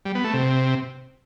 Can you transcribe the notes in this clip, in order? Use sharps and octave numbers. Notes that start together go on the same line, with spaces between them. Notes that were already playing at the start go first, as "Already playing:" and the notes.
G3
B3
A3
C3